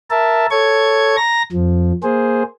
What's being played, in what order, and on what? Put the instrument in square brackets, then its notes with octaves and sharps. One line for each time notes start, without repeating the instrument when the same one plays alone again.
[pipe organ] A#4 E5 A5
A4 C#5 C#6 G#6
A#5 A#6
F2 F3
A#3 G#4 C5